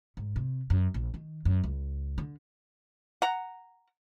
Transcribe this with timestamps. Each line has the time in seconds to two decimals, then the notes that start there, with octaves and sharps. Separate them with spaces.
0.17 G#2
0.36 C3
0.70 F#2
0.94 A#1
1.14 D#3
1.45 F#2
1.64 C#2
2.18 D3
3.22 F#5 A#5